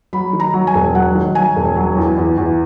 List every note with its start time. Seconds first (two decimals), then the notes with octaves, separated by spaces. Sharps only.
0.13 F#3 B5
0.33 D#3
0.40 A#5
0.54 F#3
0.67 G#5
0.74 E1
0.95 F#3 F#5
1.15 D#3
1.35 F#3 G#5
1.56 E1
1.76 F#3
1.97 E2
2.18 E2
2.38 E2